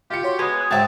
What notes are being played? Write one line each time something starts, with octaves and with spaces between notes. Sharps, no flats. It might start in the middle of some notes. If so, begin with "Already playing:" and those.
F4 G4 C#7
F#4 C#5 C6
G#3 B3 G#5
D#6 F#6
G#2 F#3 C5 E5 G5 A5